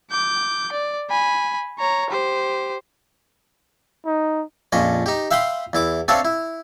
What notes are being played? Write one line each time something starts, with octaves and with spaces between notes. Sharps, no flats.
D6 G6
D5
G#5 B5
C#5 A#5
G4 C5
D#4
A#1 F2 C#4 D#5
D#4 G4
E5 F5 G5 B5 C6 D#6
E2 E4 D6
C4 D4 A4 C#5 E5 F5
E4